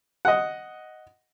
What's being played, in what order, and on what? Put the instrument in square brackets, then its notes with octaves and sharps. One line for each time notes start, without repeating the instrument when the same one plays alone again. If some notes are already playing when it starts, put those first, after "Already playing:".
[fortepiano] D#5 F#5